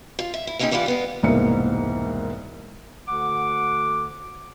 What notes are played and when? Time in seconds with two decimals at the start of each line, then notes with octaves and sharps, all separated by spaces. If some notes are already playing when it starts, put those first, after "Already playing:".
0.19 F4
0.34 E5
0.47 E4
0.59 E3 A#3 C4 C#4 D#4 G#4
0.71 E3 G3 B3 E4 F4
0.86 G#3 B3 F5
1.23 E1 C2 G#2 A#3 B3 C#7
3.08 D2 D3 F#5 D6